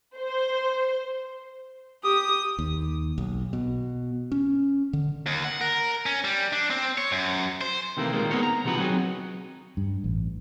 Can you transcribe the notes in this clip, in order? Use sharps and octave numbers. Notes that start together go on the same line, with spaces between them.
C5
G4 D#6
D#2
B1
B2
C#4
D3
D#2
F#5
A#4
C#4
G3
D4
C4
C#5
F#2
C5
C3 D#3 E3 A3 A#3
A#2 D#3 G3 G#3 A#3
B3 C4 G#4 A#4 C#5
A#5
B1 C3 D#3 F3 F#4 B4
F#3 B3 C4 D#4 F#4 G#4
G2
A1